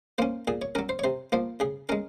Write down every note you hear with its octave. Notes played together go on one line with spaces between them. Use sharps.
A#3 C#4 C5
A#2 G#4
C#5
F#3 C#4 A#4
C5
C#5
C3 C5
F3 A#3 C5
C#3 G#4
G#3 C#4 A#4